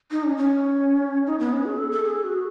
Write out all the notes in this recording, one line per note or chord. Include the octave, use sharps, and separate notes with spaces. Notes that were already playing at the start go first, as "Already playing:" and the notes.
D#4
C#4
C#4
D#4
B3
C#4
G#4
A4
A4
G#4
F#4